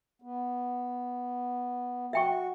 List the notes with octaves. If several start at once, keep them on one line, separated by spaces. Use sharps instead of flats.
B3
F#4 E5 G5 C#6